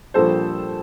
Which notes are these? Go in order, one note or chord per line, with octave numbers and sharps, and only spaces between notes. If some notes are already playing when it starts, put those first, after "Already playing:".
A#1 A#2 G3 A4 C5